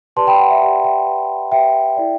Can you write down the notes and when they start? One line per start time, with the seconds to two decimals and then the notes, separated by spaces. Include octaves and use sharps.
0.16 G4 B4 D5 A5 C6
0.27 G5 B5
0.39 F#5
0.50 E5
0.61 G4 B4 D5 F#5
0.84 E5 G5
1.06 G4 B4 D5
1.51 G4 B4 D5 E5 G5
1.97 E4 A4 D5